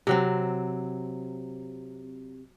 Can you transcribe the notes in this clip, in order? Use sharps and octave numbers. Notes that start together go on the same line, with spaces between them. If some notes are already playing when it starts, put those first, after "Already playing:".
C3 F#3 C4